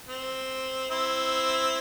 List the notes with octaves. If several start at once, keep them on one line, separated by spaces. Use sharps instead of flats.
C4
C4 E4